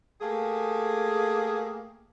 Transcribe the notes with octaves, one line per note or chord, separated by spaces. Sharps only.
A3 A#3 G4 G#4